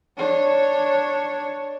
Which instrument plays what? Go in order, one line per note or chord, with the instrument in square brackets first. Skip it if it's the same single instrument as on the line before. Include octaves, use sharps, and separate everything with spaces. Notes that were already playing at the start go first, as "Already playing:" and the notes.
[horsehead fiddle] D4 C#5